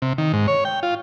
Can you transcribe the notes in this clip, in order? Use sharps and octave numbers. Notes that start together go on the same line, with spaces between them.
C3
D#3
G#2
C#5
G5
F4